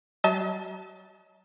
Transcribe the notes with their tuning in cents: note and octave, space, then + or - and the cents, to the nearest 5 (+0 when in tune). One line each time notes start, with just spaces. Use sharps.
F#3 +35 D#5 +45 A5 +0